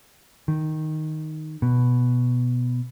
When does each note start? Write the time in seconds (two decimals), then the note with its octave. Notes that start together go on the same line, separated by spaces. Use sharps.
0.48 D#3
1.62 B2